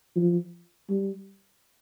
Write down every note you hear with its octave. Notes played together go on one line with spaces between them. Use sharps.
F3
G3